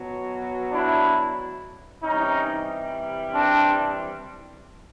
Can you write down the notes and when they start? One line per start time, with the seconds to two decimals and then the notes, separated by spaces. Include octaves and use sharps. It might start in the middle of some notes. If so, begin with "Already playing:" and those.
Already playing: B2 F#3
0.72 D4 E4
2.03 C3 E3 G3 C#4 D#4
3.33 C4 D4